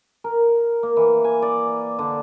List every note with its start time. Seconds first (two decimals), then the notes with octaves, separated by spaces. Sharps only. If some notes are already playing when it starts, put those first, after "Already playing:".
0.24 A#4
0.83 A#3
0.97 E3
1.24 G#5
1.42 D5
1.99 D3